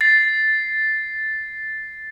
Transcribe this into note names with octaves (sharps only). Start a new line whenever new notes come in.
A6 C7